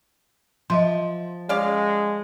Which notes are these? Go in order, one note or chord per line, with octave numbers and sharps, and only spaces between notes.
F3 D#5 E5 C6
G#3 C#4 D5 F5